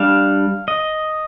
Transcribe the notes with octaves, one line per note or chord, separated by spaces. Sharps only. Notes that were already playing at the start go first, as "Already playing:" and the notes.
Already playing: G3 D4 F5
D#5